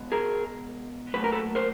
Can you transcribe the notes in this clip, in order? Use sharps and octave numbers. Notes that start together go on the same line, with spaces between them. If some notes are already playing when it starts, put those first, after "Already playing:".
Already playing: B2 G#3 B3
G#4 A#4
A#2 F#3 A3 B4
A#4
A4 B4
A#4 C5